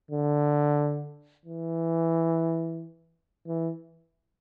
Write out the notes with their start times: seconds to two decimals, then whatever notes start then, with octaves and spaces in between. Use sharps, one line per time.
0.11 D3
1.46 E3
3.47 E3